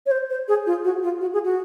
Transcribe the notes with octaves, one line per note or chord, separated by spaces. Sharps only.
C#5
C5
C5
G#4
F4
F#4
F4
F#4
G#4
F#4